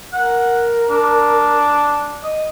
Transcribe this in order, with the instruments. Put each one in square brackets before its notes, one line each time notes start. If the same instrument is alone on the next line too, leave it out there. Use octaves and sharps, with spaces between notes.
[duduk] A#4 [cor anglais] F#5
[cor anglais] D4
D#5